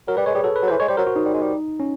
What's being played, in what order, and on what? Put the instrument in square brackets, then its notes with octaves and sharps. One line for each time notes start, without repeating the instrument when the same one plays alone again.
[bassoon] F#3 [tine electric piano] A#4
[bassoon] G3 [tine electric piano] B4
[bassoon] G#3 [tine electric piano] C#5
[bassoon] G3 [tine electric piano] G#4
[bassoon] F#3 [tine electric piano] A4
[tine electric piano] B4
[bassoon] F#3
[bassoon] E3 [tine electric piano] C5
[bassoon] G#3 [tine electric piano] C#5
[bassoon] G3 [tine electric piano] C5
[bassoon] F#3 [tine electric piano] A#4
[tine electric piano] F#4
[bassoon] F#3 [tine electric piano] D#4
[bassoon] G3
G#3
G3
[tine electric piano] C#4